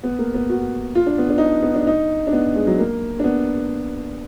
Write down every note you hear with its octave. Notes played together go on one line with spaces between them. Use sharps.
B3
A#3
B3
F#4
F4
D4
B3
D4
D#4
D4
B3
D4
D#4
D4
B3
G#3
F#3
A#3
D4
B3